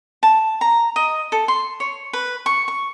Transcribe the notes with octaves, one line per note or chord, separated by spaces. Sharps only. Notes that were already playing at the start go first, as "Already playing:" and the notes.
A5
A#5
D#5
A4
C6
C#5
B4
C#6
C#6